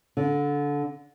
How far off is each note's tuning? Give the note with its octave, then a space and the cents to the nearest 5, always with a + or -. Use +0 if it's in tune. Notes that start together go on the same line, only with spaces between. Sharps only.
D3 -20